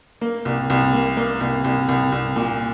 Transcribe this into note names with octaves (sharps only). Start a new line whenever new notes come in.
A#3
C2
C2
A#3
A#3
C2
C2
C2
C2
A#2